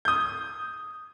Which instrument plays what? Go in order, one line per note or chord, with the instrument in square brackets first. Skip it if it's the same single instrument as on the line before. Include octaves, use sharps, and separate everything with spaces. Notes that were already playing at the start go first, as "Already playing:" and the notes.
[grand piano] D#6 G6